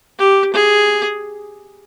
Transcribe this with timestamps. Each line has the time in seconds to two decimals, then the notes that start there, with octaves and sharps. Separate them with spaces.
0.18 G4
0.54 G#4